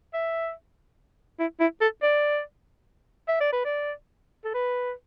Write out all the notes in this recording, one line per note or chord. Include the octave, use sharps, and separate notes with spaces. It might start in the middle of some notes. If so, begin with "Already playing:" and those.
E5
E4
E4
A4
D5
E5
D5
B4
D5
A4
B4